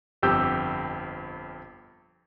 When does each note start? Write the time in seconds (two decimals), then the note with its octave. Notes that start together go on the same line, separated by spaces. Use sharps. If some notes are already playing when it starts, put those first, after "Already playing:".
0.22 G1 F2 G4 E6 G6